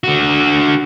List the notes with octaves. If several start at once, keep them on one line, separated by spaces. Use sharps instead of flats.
D3 F#4